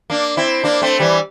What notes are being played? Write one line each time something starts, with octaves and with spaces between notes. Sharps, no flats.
A#3 D4
C4 E4
A#3 D4
A3 C4
E3 G3